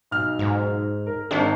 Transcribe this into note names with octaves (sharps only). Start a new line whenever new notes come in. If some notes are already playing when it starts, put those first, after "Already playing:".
B1 F6
G#2
A#4
G#1 G#2 D4